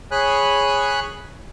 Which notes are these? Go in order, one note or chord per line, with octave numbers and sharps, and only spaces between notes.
G#4 C#5 G#5 B5 F#6